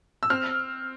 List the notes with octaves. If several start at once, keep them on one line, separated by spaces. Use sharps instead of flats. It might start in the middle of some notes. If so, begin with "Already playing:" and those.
E6
C4 F6